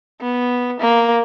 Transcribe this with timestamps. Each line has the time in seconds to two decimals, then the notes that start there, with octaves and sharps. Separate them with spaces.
0.21 B3
0.80 A#3